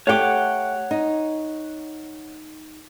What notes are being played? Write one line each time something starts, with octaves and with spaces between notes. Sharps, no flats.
A3 G4 C#5 F#5 D6
D#4